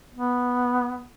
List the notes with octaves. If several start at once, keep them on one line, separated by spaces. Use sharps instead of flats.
B3